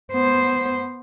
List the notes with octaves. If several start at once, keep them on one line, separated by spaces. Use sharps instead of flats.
B3 C5